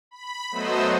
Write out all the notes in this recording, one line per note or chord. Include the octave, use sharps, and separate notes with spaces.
B5
F#3 A3 B3 C5 D#5 E6